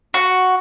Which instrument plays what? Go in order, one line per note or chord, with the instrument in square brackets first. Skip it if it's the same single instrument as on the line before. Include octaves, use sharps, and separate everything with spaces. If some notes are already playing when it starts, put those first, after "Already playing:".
[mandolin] F#4